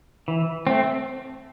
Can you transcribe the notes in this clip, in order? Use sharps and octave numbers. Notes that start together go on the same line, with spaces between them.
E3
A3 C4